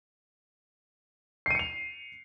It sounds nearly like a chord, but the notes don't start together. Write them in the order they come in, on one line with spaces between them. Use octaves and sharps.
C7 D#7 C#7 F7